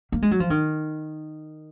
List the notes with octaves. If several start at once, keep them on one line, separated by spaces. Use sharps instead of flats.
A#3
G#3
F#3
F3
D#3